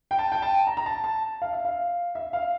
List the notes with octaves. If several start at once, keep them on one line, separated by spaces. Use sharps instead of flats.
G5
A5
G5
A5
A#5
A#5
A5
A5
F5
E5
F5
E5
F5